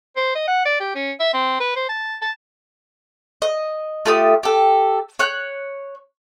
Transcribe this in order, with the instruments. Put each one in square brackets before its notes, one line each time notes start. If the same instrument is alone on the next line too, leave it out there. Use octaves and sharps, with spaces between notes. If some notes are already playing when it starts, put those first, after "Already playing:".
[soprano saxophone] C5
D#5
F#5
D5
G4
C#4
E5
C4
B4
C5
A5
A5
[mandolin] D#5
A3 F4 G4 D#6
G4 A4
C#5 F#6 G6